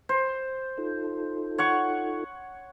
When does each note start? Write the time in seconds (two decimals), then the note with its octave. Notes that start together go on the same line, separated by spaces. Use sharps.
0.09 C5
0.78 D#4 F4 A4
1.58 C#5 F#5 C#6